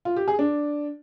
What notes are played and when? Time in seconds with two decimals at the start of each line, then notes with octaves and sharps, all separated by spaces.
0.05 F4
0.16 G4
0.28 G#4
0.39 D4